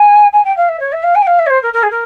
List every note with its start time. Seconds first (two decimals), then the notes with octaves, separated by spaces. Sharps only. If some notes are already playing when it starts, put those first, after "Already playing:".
Already playing: G#5
0.32 G#5
0.44 G5
0.56 F5
0.68 E5
0.79 C#5
0.92 E5
1.03 F5
1.15 G#5
1.21 G5
1.26 F5
1.39 E5
1.46 C#5
1.50 C5
1.62 A#4
1.73 A#4
1.82 G#4
1.90 A#4